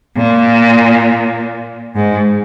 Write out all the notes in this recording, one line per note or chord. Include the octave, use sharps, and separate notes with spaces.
A#2
G#2